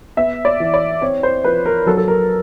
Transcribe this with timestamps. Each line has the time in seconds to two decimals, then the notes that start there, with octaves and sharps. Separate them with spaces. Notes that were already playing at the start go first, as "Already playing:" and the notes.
0.17 B3 E5
0.45 D5
0.60 E3
0.74 D5
1.01 C4 C#5
1.23 C5
1.44 F3 B4
1.66 A#4
1.86 F#3 A4
1.97 A4
2.08 A#4